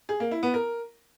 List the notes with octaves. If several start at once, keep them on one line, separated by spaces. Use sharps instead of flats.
G#4
A#3
E4
B3
A#4